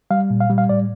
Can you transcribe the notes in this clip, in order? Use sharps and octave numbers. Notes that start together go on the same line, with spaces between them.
G3 F5
A#2
F5
G3
F5
A2 D5